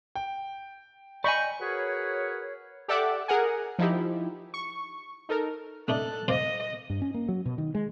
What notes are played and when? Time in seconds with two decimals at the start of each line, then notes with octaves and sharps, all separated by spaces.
0.15 G5
1.24 D5 D#5 G#5 B5 C#6 G6
1.61 F#4 G#4 A#4 B4 C#5
2.88 G4 A4 D5 E5 F#5 D6
3.28 G#4 A#4 F#5 G#5
3.79 F3 D#4 E4 G4
4.54 C#6
5.29 D#4 A4 A#4
5.88 A3 D4 D#4 A4 F#6
6.28 C5 D5 D#5 F5
6.90 G2
7.02 C#4
7.14 A#3
7.29 F#3
7.46 B2
7.58 D#3
7.75 G#3